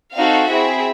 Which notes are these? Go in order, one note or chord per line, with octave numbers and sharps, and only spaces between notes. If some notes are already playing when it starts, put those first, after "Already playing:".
C4 D#4 F#4 A4 F5
C4 E4 G#4 E5